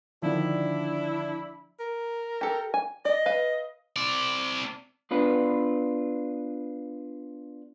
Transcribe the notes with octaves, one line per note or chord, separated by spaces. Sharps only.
D3 D#3 F3 D4 E4
A#4
G4 A4
G#5
D5 D#5
B4 F5
C4 D5
B3 D4 F4 B4